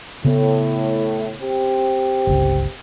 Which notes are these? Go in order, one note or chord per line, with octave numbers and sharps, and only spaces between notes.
A2 C#3 B3
C4 G4
G1 C#2